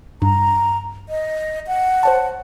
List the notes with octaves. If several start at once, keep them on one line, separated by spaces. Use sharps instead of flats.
G2 A#5
D#5
F#5
C5 C#5 A5